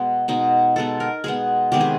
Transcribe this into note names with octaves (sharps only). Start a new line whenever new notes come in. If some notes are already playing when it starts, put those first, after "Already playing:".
Already playing: B2 G#3 B3
B2 G#3 B3 D#4
B2 G#3 B3 A4
A#4
B2 G#3 B3 G#4
C3 D#3 G#3 B3 G4
G#4